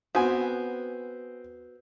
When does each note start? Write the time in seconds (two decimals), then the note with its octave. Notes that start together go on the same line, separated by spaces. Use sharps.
0.15 B3 C4 F#4 G#5